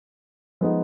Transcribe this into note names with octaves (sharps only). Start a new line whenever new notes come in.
F3 G#3 B3 D#4